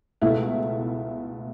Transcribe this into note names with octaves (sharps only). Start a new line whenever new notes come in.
C#2 B2 A3 E4